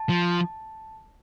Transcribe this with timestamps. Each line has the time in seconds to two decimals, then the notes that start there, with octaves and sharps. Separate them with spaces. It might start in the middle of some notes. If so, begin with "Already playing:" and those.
Already playing: A5
0.09 F3